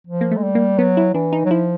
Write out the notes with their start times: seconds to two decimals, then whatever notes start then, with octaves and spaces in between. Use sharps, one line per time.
0.07 F3
0.21 A#3
0.31 A3
0.37 G#3
0.43 G3
0.55 A#3
0.79 F#3 B3
0.97 E4
1.14 E3 D4
1.33 D#4
1.45 F#3
1.51 F3 E4